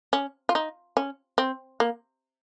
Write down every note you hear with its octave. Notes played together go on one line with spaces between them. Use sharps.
C#4
F4
D#4
C#4
C4
A#3